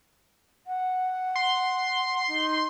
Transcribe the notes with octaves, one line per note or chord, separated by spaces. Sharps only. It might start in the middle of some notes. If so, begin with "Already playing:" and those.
F#5
C6
D#4